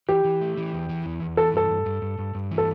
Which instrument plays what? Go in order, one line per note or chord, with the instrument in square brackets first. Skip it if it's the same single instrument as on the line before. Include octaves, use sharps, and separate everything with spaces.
[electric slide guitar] E3 [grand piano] G4
[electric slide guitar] E3
A3
E3
E2
E3
E2
E2
[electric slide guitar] E3 [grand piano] A4
[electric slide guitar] G2 [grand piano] A4
[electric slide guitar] G2
G2
G2
G2
G2
E3
[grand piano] A4